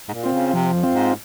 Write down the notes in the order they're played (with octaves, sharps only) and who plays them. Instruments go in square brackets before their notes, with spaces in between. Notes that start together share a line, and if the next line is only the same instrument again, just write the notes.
[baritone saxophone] G#2
A#2
[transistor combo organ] C4 F4
[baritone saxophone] C#3
[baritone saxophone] C3 [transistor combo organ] F3
[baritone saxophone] F2
[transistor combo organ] C4 F4
[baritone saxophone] G#2